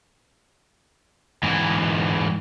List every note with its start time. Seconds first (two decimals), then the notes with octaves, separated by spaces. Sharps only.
1.43 G#2 E3